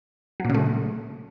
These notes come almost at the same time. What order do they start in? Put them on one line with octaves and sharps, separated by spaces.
F#3 A#2 C#3 A3